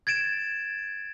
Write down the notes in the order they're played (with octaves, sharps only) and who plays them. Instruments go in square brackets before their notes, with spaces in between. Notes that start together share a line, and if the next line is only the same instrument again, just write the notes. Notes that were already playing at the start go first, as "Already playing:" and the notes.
[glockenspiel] G#6 A6 D7 E7